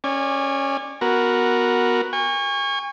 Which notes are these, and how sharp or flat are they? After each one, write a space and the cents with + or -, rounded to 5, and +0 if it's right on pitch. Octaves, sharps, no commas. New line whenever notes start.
C#4 -5 D5 +15 G#5 -25
B3 +0 F#4 -5 A#4 +0
G#5 -40 C#6 +0